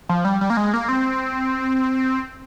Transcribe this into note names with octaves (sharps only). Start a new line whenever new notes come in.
F3
G3
G3
A#3
G#3
A#3
C4